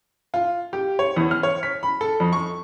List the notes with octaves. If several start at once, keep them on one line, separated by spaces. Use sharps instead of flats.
F4
G4
C#5
E2
F6
C#5
B6
B5
A4
F2
C#6